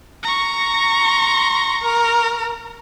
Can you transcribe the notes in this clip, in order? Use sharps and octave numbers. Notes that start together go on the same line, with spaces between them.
A#5 C#6
C6
A#4